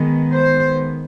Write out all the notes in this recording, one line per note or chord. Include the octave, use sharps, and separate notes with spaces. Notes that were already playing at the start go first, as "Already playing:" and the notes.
Already playing: D#3 G#3 B3
C5